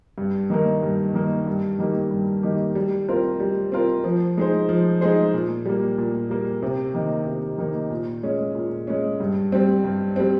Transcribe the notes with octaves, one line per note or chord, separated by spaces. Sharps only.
G2
D#3 A#3 D#4 A#4
G2
D#3 A#3 D#4 A#4
G2
D#3 A#3 D#4 G4
G2
D#3 A#3 D#4 G4
G3
C4 F4 A#4
G3
C4 F4 A#4
F3
G#3 D#4 G#4 C5
F3
G#3 D#4 G#4 C5
A#2
G3 A#3
A#2
G3 A#3
C3
D#3 A#3 D#4
C3
D#3 A#3 D#4
A#2
G#3 C#4
A#2
G#3 C#4
G2
G3 C4
G2
G3 C4